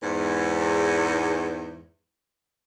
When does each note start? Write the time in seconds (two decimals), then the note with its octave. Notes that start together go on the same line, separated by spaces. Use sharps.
0.03 E2 G#2